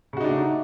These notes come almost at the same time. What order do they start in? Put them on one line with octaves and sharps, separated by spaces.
C#3 F#4 D#4 D4 A3